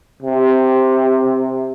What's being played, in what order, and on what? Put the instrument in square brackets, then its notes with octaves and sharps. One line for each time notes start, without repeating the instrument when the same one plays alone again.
[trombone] C3